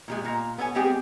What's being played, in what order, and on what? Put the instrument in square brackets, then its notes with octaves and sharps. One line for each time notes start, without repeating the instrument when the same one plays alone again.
[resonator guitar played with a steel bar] A#2 G3 G#3
A#2 A#5
B3 A4 C#5 G#5
G3 G#3 B3 C4 G4 G#4